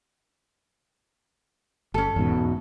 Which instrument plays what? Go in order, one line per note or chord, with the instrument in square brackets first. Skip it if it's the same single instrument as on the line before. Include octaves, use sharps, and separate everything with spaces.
[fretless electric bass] G1 [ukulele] C#4 A4
[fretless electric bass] E2 G#2 B2